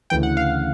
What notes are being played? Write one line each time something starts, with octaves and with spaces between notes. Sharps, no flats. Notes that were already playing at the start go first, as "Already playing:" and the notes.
D2 C#3 E3 G5
F#5
F5